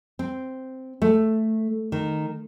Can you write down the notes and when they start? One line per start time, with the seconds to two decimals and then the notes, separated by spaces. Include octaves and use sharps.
0.19 C4
1.02 A3
1.92 D#3